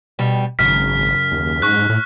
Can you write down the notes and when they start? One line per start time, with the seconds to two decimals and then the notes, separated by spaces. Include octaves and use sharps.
0.19 B2 G3
0.59 G#1 F#2 C#3 F6 B6
1.32 D#2
1.62 G#2 C#6 F#6
1.89 A2